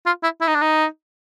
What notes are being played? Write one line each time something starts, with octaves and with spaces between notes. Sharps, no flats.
F4
E4
E4
D#4
D4
D#4